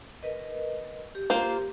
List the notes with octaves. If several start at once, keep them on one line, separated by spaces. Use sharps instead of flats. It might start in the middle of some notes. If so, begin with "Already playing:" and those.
A#4 B4 D#5
G4
A#3 F4 C5